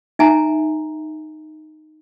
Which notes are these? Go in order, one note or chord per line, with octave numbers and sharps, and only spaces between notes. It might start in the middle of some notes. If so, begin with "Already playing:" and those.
D#4 E5 G#5 A#5